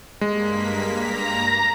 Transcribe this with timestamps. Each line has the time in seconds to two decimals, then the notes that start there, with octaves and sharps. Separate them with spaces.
0.21 G2 G#3 A#3 B6
1.01 A#5